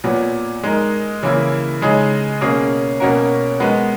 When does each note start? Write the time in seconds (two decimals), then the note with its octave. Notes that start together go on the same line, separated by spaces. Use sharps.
0.04 A#2 F#3 B3
0.64 G#3 D#4 A#4
1.23 C#3 E3 A#3 E4
1.81 C#3 G#3 D#4 G#4
2.41 B2 A#3 C#4 G#4
3.00 B2 A#3 C#4 F#4 A#4
3.60 G#3 B3 F#4 A#4